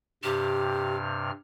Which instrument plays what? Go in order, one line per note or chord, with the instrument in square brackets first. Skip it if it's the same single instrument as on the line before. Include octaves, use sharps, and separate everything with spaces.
[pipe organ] G2 C3 F6 [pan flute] G4